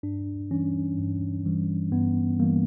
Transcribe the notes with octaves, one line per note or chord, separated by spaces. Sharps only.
G2 D4
E3 G3 C#4
G2
E3 G3
G2 B3
E3 G3 A#3